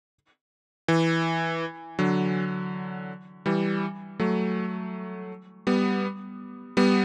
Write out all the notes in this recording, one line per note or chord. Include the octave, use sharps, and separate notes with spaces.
E3
D3 F#3
E3 G3
F#3 A3
G3 B3
G3 B3